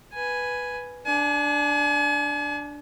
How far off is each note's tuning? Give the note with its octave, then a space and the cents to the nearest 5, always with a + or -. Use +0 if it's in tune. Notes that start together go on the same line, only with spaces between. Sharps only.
B4 +0 G#5 +0
D4 +0 G#5 +40